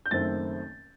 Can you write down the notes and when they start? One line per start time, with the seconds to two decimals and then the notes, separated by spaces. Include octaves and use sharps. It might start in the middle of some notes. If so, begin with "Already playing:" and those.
0.06 G6
0.11 F#1 F#2 D#3 A3 C4 A6